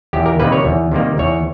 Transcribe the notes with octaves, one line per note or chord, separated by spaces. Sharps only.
E2 G4
A#4
C3 D#3 G3 A#3 B4
C#5
E2
C3 D#3 G3 A#3
E2 C#5